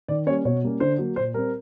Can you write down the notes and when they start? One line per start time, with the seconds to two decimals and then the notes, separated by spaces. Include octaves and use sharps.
0.08 D#3 D5
0.26 G3 A#3 C#4 C#5
0.45 B2 C#5
0.63 G3 A#3 C#4
0.80 D3 C5
0.98 F#3 A#3
1.16 A#2 C5
1.34 G3 C4 A#4